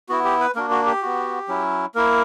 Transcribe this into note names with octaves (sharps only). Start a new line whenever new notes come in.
B3 E4 F#4
G4
B4
A#3 D4 F#4 A#4
F#4
G4
B3 F#4
F#3 C#4 E4
A#3 E4 A#4